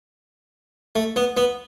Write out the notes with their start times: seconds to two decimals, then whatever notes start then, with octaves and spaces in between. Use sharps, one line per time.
0.96 A3
1.16 B3
1.37 B3